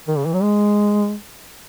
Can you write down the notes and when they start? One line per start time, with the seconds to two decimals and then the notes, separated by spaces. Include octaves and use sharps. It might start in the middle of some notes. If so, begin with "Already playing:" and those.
0.08 D#3
0.17 C#3
0.25 E3
0.33 F#3
0.42 G#3